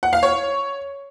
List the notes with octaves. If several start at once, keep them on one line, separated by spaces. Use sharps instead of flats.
F#5
F5
C#5